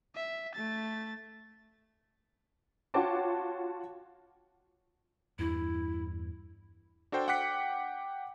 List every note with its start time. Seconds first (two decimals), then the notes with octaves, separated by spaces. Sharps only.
0.15 E5
0.55 A3 A6
2.94 F4 F#4 C#5 G5 A5 D6
5.39 E2 G2 E4
7.12 D4 F#4 A4 C5 G5
7.28 F#5 G5 D6 F#6 B6 C#7